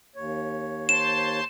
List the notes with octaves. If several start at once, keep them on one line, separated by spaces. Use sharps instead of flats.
D#2 C#5
C5 A5 C6 E7